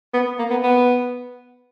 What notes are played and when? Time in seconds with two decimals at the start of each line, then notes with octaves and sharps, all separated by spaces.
0.14 B3
0.39 A#3
0.50 B3
0.63 B3